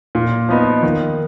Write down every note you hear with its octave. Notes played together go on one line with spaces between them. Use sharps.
A#2
F3 B3 D#4
D#3